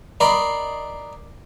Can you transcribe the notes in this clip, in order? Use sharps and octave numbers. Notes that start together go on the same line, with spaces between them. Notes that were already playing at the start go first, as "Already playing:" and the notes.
A#4 D5 D#5 B5 C6